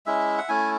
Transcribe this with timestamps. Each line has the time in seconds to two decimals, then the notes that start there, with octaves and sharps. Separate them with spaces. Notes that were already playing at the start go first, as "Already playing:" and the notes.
0.06 G#3 C#4 E4 E5
0.38 F#5
0.49 A3 C#4 E4 G#5